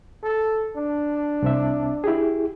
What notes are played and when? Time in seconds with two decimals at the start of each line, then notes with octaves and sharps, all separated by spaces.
0.23 A4
0.76 D4
1.42 C2 C4 E5
2.04 E4 G4 G#4